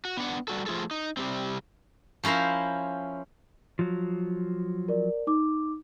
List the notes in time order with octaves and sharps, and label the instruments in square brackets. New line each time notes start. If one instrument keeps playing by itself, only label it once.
[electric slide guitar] F#4
B3 D4 F#5
G3 F#4 A4
F3 A3 F4 G#4 A4
D#4
C3 G3 C4
[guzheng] F3 C#4 E4 A#4 C5
[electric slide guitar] F3 F#3
[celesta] A#4 D5
D#4 D6